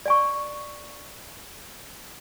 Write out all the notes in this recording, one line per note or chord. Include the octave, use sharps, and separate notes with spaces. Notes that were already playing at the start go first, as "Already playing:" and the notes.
D5 G#5 C#6